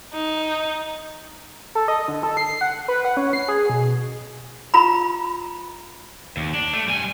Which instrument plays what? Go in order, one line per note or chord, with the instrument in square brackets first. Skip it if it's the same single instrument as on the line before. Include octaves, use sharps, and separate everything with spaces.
[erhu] D#4
[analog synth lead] A4
D#5
D3
A4
C7
F#5
B4
F#5
C#4
C7
G#4
B2
[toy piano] F4 A#5 B5
[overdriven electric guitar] D#2
D4
A3
G3 G#5